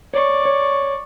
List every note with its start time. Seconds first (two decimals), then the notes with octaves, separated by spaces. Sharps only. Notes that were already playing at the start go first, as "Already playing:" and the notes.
0.14 C#5 D5 C#6
0.45 C#5